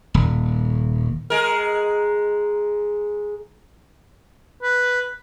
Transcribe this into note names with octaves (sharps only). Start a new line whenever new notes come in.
D#1
G#3 A#4
B4